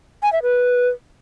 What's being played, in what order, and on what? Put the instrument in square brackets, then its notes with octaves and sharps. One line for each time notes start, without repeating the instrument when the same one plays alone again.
[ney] G#5
E5
B4